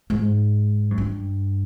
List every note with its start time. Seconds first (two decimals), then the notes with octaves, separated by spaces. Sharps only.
0.10 G#2
0.91 F#2
0.98 G2